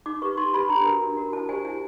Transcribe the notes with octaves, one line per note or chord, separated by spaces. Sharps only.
D#4 D6
G4 B4 C#6
D#4 C6
G4 B4 B5
D4 A#5
F#4 A#4
D4
F#4 A#4
E4 A5
G4 C5 G#5
E4 G#5